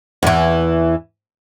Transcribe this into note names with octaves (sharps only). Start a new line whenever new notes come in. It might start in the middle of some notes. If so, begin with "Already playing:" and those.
E2 E3